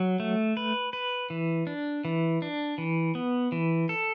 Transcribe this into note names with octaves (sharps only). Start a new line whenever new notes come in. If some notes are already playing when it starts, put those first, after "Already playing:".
Already playing: F#3
A3
B4
B4
E3
D4
E3
D4
E3
B3
E3
A4